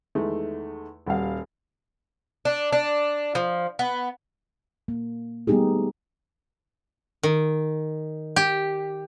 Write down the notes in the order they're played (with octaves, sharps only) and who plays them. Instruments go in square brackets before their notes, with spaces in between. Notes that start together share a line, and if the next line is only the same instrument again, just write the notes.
[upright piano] E2 D#3 G#3 A3
D#1 G3 F#4 F5
[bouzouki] D4
D4
F3
B3
[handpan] A#3
G3 A3 B3 D#4 G4 G#4
[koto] D#3
G4